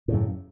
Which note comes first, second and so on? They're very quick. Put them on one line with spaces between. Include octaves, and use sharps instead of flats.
A2 C#3 F#2